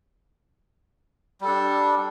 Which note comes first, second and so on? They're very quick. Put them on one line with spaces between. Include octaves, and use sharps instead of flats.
G3 A4 D4